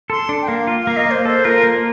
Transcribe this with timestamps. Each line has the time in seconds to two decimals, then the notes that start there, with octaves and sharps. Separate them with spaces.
0.10 A4 C6
0.29 D4
0.42 G5
0.48 A#3 F5
0.67 F4
0.83 A#3 F5
0.97 D#5
1.06 A#3
1.11 C5
1.25 A4 C5
1.45 F4 A#4
1.64 A#3